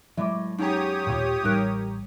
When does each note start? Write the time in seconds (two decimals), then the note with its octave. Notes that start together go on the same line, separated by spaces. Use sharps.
0.18 A2 F#3 G#3 E5 D6
0.58 F#2 D#4 G4 G#4 C#5 A#5 D#6
1.07 D#2 A#2 A3 F4
1.44 A1 G3 D#4 A#4 F#6